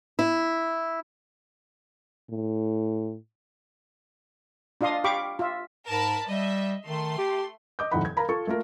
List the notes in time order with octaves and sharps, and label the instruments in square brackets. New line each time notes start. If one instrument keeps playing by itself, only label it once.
[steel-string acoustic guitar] E4
[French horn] A2
[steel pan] D4 F4 D#5 F5 C6 D#6
G4 F5 G5 B5 C#6 D6
F4 E5
[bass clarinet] G#2 [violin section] A#4 A5 B5
[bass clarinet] G3 [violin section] D#5 E5
[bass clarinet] D#3 [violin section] A3 C6
[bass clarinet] G4
[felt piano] D#5 D6 G6
D#1 F2 G#2 E4 F#5 B5
G#6
A#4 F5 A#5 B5
F4 A4 C#6
A3 A#3 F4 A#4